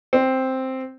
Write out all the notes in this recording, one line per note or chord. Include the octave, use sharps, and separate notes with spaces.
C4